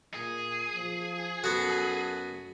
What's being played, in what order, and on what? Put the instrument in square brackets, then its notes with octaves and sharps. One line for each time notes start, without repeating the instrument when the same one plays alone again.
[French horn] A#2 [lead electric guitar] G#4
[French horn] F3
[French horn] F#2 [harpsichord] B3 F#4 [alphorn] A4